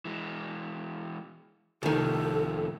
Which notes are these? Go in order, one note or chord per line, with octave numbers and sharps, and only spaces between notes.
E3 G#3
C2 A2 D#3 F3 A4